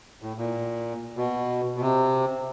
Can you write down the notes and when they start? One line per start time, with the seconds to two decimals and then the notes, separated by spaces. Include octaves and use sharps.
0.22 A2
0.38 A#2
1.17 B2
1.76 B2
1.81 C3